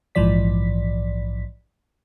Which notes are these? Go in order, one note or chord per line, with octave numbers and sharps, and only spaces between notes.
A#1 G#2 E3 F3 D5 B6